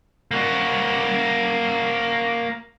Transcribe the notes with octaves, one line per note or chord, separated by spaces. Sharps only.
A#3 F#4